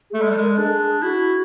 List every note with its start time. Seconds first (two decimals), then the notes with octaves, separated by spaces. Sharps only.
0.10 G#4
0.14 A3 A4
0.22 G#3
0.30 G3
0.38 G#3 A#4
0.50 A4
0.58 D4 G#4
1.02 E4 F#4